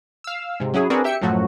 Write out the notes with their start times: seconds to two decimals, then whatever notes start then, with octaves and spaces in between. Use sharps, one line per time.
0.24 F5 E6
0.60 G#2 C3
0.74 F#3 C#4 E4 G#4
0.90 C4 D4 F#4 G#4 A#4 B4
1.04 G4 E5 G5 C#7
1.21 F#2 A2 F3 F#3 A3 F#4